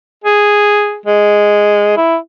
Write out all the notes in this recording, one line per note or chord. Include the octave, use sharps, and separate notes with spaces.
G#4
G#3
E4